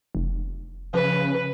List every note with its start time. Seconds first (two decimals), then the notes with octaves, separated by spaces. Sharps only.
0.15 F1
0.94 C#3 F3 B4